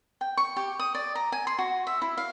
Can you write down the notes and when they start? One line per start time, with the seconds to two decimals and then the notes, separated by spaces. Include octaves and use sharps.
0.21 G5
0.37 C#6
0.56 G4
0.79 D#6
0.95 D5
1.15 A#5
1.32 G#5
1.47 C6
1.59 F#4
1.87 E5
2.02 E4
2.17 F5